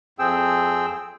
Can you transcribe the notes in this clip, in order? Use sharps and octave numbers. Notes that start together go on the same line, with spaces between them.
F2 C4 G#4 G5 E6